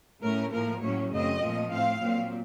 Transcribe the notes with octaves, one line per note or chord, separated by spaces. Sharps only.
A2 A3 C#4 A#4
A2 F3 A#3 A#4
A2 F#3 A#3 C#4 C#5
F#2 C#3 A3 C4 D#5
A#2 F3 A3
A2 A3 C4 F5
A#2 F#3 C4